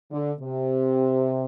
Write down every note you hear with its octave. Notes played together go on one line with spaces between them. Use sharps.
D3
C3